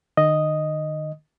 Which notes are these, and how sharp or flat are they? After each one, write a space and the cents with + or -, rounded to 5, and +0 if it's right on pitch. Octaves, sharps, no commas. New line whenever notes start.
D#3 -40 D#5 +0 D#6 +0